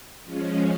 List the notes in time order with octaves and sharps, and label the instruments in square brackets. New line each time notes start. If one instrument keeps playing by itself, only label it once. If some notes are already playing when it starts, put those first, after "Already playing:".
[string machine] F3 G#3 C#4